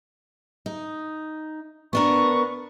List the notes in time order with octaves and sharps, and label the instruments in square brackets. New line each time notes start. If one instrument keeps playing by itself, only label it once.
[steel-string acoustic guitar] D#4
[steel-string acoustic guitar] B3 D4 A#4 [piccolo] C#6